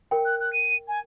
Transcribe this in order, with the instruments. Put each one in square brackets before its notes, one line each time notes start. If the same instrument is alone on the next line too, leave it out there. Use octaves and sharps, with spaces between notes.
[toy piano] A#4 G5
[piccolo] F#6
F#6
D#7
G#5